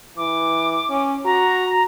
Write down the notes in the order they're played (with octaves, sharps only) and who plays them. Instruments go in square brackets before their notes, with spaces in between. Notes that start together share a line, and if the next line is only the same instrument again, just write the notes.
[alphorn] E3 [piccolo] D6
[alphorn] C#4
[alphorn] F#4 [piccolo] A#5